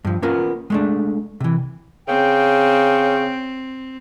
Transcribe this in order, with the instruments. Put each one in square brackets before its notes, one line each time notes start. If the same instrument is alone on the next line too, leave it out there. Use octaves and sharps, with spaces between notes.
[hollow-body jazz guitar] G2 F3
A#3 B3 C#4 F4 A#4
G#3 A3 D4
C3 E3
[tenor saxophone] C#3 [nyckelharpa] C4 [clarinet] G5